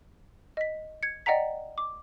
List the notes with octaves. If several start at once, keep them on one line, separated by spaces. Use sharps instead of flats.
D#5 B6
G#6 C#7
D5 D#5 F#5 G5 A#5 B6
D6